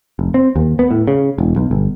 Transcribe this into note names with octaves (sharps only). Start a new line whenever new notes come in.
F1
C4
D#2
B3
A2
C#3
E1
B1
G1